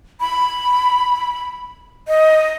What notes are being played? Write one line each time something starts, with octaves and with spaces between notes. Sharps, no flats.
B5
D#5